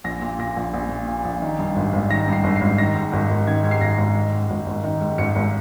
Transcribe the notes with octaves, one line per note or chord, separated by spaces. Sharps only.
A#1 A#6
A#2
A#2 A#6
A#1
A#1
A#2
A#2
A#1
D#3
G2
G#1
G#1
D#3 A#6
G2 C7
G#1
C7
G#1
D#3 A#6
G#2
G#1
G#1
D#3 G#6
G#2
C7
G#1 A#6
G#1
D#3
G#2
G#1
G#1
D#3
G#2
G#1 C#7
G#1